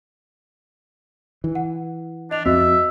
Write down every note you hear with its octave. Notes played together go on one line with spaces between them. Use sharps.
E3
F#5
D4 D#5 F7
F2 C4 F#4 D#5 E5